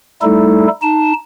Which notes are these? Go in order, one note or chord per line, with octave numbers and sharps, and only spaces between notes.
G3 A3 D#4 E4 A4
D#4 A5